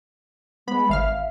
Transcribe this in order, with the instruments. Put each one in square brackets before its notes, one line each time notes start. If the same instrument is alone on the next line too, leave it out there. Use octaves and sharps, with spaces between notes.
[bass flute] G#3 [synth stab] B3 B5
[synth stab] G#1 F5 F6 [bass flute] E5